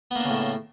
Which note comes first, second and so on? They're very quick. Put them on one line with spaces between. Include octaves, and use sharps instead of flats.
B3 A#3 D4 C#3 A2